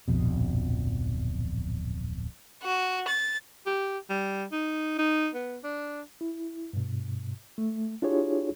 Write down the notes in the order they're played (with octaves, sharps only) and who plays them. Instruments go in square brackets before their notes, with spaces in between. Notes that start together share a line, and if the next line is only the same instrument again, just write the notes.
[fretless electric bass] D1 A#1 F2 B2
[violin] F#4
A6
[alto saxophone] G4
G3
D#4
D#4
B3
D4
[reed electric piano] E4
G2 B2
A3
D4 E4 F4 G4 G#4 C#5